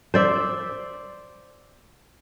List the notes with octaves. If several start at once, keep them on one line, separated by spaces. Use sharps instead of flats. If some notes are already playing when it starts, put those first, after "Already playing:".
C5 D5 E5